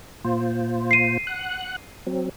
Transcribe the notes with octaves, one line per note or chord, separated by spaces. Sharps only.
A#2 F4 C5
C7 D#7
F#5 F#6
F#3 C4